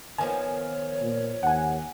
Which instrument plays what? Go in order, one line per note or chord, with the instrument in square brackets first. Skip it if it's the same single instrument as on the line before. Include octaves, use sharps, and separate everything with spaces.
[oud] D#3 F3 B3 [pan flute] C#5 [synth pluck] G#5
[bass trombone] A#2
[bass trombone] D#2 [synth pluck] F#5 G#5